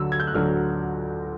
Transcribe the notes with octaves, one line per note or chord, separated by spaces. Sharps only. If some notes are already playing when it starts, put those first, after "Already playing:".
Already playing: D2 D3 F#3 E6
G#6
G6
F#6
D2 D3 F#3 F6